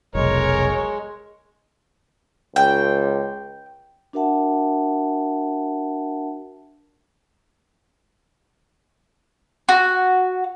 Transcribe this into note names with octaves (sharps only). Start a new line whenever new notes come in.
F1 B1 G#3 A#4 C#5
C#2 G5
D4 F#4 A#4 E5 F#5 A5
F#4